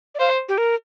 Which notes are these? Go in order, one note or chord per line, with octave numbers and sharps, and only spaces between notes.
D5
C5 F5
G4
A#4